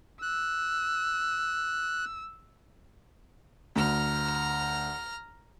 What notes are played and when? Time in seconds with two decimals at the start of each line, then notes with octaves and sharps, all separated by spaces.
0.22 E6 F#6
3.76 D2 A#5 F6